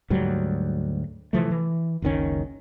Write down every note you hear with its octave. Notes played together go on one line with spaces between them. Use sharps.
D2 G#2 F#3 G3
C3 E3 F3 A3
E3
F#1 C#2 D#3 C#4